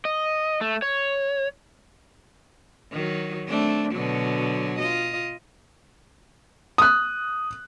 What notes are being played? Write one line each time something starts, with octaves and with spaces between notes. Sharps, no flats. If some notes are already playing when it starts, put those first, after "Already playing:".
D#5
A3
C#5
D#3 F#3
A3 C4 D4
B2 D3 F#3
F4 D#5
D#6 F#6